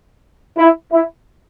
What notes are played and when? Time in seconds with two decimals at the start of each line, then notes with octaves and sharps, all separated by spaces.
0.58 E4
0.91 E4